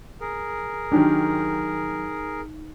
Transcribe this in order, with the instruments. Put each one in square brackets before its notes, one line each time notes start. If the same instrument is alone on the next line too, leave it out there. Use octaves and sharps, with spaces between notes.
[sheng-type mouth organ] G#4 A#4
[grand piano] D#3 F#3 G4 [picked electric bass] D4 [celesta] D#4